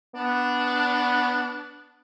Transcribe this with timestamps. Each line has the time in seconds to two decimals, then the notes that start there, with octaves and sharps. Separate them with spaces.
0.15 B3 D4